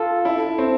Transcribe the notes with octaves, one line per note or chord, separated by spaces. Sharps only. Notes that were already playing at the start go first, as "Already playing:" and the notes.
Already playing: F4 A4
E4
C4